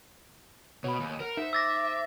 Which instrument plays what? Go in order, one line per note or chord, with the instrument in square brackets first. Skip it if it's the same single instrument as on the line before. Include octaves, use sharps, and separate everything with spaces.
[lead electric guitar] B2 [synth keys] C#5 B5
[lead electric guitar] D#2 [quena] G#5
[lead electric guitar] A#4 [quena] F#5
[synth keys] D#4 C5 [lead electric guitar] E5 [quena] F#5
[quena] D6 [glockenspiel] E6 A6 A#6